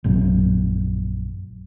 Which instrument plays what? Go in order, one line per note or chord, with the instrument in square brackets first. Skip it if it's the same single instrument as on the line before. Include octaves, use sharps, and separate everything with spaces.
[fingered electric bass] A#1 F#2